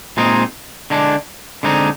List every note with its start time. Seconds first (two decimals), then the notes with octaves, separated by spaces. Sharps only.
0.17 A#2 G#3 C4 D#4
0.90 D3 G#3 D4
1.63 D3 G#3 C4 D#4